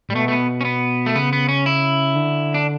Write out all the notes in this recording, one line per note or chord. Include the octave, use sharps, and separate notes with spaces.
A2 G3
B2 A3
A3
B3
C#4
B3
A3
C#3 B3
B3
C#4
E4
D3
D4